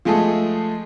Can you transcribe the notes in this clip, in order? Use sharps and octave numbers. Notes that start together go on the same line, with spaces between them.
F3 G#3 A3 G#4 A4